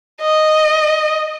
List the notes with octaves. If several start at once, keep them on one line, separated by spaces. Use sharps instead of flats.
D#5